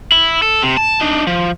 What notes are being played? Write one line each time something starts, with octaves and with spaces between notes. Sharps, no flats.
E4
A4
C3
A5
D4 D#4
F3